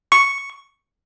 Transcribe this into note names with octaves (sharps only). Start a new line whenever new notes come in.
C#6